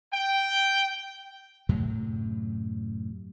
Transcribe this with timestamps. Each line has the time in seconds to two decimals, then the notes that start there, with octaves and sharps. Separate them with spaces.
0.13 G5
1.69 F#2 A2 C3 F#3